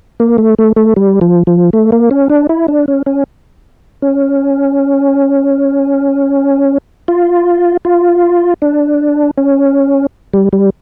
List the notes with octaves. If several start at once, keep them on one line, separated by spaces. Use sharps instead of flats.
A#3
A3
A3
A3
G3
F3
F3
A3
A#3
C#4
D4
E4
D4
C#4
C#4
C#4
F4
F4
D4
C#4
G3
G3